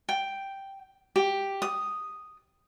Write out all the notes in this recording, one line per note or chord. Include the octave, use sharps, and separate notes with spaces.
G5
G4
D#6